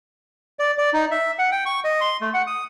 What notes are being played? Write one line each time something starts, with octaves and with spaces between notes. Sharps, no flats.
D5
D5
D#4
E5
F#5
G5
C#6
D#5
C6
A3
F#5
D#6